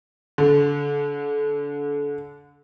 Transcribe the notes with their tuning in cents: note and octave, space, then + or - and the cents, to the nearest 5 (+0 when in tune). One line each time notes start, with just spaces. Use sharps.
D3 -35